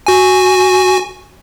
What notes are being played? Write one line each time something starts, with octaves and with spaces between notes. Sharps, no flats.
F#4 G#5